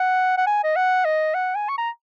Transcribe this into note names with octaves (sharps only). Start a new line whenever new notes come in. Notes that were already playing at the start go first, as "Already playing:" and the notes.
Already playing: F#5
F#5
G#5
D#5
F#5
D#5
F#5
G#5
C#6
A#5